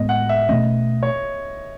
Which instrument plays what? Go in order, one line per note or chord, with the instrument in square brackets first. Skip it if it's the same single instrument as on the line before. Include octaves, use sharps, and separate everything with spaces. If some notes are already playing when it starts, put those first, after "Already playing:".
Already playing: [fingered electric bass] A2 G#3 B3 [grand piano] D#5
[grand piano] F#5
E5
[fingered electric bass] B2 A3 C#4 [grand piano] D#5
[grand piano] C#5